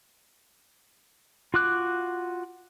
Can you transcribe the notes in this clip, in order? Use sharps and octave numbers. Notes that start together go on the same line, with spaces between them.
F4 F#4 D6 F#6